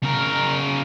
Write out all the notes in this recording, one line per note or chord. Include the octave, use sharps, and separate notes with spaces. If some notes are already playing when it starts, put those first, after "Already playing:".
C#3 A#4